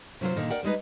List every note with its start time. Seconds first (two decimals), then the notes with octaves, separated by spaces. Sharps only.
0.21 C3 F#3 F4 C5
0.36 A#2 D3 D#3
0.50 A#4 D5 F#5 G5
0.63 G3 G#3 D#4 B4